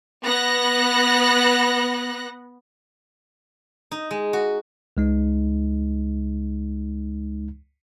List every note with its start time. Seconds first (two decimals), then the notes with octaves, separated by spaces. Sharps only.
0.23 B3 F#6 A#6
3.92 D#4
4.11 G#3
4.33 F#4
4.97 C#2 G#3 D#4